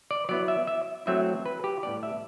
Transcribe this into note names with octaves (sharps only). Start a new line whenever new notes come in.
D5
F#3 B3 E4 D5
E5
E5
F#3 A3 C4 E4 E5
B4
G4
A2 G3 B3 D4 D5
E5